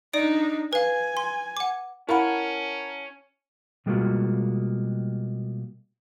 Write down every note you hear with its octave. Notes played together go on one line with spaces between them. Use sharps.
D4 D#4 D5 D7
B4 F5 G#5
C6
F#5 D6
C#4 E4 A#4 F5 F#5 A5 B5
B2 G3 G#3 A#3 F4 F#4